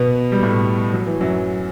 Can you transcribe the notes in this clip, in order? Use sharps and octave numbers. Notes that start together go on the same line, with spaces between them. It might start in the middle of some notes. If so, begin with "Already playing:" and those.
Already playing: B2 B3
G3
A2 A3
F#3
E3
F#2 F#3